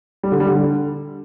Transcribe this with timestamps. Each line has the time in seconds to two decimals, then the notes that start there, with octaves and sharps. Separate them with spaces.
0.23 G3
0.32 D3
0.40 G3
0.48 D3